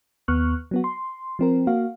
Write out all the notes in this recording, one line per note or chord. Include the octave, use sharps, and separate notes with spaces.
D#2 B3 C#6 F6 F#6
F#3 B3 F#4
C6
F3 C4 A#4
A#3 F#4 F5